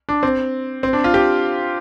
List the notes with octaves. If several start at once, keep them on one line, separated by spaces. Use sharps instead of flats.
D4
C4
C4
D4
F4
G4